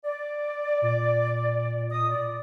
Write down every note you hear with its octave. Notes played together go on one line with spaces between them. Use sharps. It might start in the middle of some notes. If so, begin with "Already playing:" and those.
D5
A#2
D#5 D#6
D5